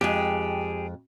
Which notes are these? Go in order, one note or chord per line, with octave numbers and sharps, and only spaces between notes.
F2 G#3 G4 G#4